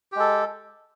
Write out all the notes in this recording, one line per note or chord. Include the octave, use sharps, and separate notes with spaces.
G#3 G4 A4